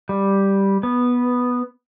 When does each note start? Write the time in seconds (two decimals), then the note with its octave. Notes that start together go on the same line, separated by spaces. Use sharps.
0.09 G3
0.83 B3